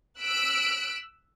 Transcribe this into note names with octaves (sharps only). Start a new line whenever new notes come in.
E6 F#6 B6 D7